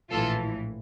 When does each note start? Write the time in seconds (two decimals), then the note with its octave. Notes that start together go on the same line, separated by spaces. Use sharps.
0.10 A#1 A2 E3 F4 A4